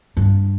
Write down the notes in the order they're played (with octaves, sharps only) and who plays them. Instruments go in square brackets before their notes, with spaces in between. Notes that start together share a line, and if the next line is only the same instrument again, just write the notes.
[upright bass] G2